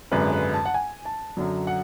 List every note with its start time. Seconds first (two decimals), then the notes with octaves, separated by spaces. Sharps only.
0.11 G#1 F#2 D3 G#3 B4
0.32 B4
0.53 A5
0.65 F#5
0.74 G#5
1.05 A5
1.37 F#2 D3 F#3
1.67 F#5